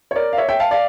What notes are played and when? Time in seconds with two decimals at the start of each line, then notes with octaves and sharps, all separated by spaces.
0.11 C#5
0.16 A#4 D5
0.33 F5
0.37 C#5 E5
0.49 E5 G5
0.60 F5 A5
0.71 D5 F5